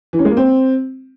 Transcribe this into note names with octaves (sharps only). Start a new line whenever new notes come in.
E3
C#4
G#3
A#3
C4